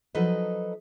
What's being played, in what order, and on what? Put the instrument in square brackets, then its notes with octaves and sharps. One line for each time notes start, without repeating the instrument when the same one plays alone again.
[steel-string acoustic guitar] F3 F#3 D#4 A4 B4 D#5